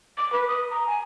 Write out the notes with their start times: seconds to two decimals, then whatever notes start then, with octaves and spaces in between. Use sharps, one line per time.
0.17 D6
0.32 B4
0.48 D#6
0.71 A#5
0.87 G#5